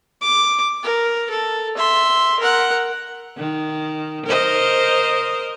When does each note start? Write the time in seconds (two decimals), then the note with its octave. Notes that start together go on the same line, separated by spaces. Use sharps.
0.22 D6
0.83 A#4
1.30 A4
1.77 E5 C6
2.39 A#4 F#5
3.37 D#3
4.26 A#4 C5 D#5